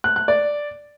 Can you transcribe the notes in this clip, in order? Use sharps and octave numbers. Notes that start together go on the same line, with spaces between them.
F#6
F#6
D5